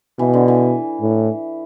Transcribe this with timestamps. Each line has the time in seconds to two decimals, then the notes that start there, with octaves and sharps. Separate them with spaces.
0.19 B2 E3
0.34 D3
0.48 E3
1.01 A2